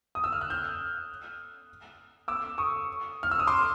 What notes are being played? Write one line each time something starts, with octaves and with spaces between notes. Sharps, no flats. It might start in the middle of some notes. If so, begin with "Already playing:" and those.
D#6
E6
F6
F#6
F6 G6
D6 E6
C#6 D#6
F6
E6
D#6
C6 D6